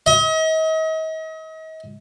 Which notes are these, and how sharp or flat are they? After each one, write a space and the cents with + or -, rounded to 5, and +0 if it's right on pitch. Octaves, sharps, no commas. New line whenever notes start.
D#5 +40